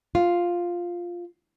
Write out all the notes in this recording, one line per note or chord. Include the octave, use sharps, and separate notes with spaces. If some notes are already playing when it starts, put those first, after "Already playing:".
F4